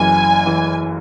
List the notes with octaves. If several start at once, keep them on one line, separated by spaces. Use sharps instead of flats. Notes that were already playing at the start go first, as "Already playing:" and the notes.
Already playing: F#1 F#2 E3 G#5
E3